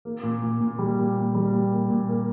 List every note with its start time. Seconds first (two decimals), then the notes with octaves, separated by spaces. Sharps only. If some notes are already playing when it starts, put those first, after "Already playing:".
0.05 A#3
0.23 A#2
0.42 A#2
0.61 A#2
0.79 G3
0.98 A#2
1.16 A#2
1.35 G3
1.53 A#2
1.72 A#3
1.90 A#2
2.09 A#3